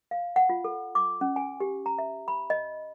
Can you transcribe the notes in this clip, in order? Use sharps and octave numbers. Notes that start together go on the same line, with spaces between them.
F5
F#5
F4
A4
D6
C#4
G#5
G4
A#5
E5
B5
D#5